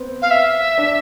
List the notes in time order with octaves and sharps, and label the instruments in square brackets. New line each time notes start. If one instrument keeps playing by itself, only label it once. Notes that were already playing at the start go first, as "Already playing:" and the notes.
Already playing: [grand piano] B3 C4 C5
[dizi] F5
E5
[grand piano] D4 D5